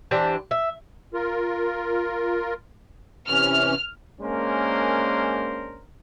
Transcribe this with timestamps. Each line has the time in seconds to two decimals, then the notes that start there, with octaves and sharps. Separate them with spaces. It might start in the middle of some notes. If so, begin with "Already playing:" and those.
0.11 E3 D4 G4 C5
0.51 E5
1.14 F4 A#4
3.28 C3 E3 C#4 F6
4.20 G#3 A#3 C#4 D4 A#4 C5